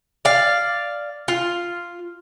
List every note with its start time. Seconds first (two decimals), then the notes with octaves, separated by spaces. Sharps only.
0.25 D5 F5
1.28 F4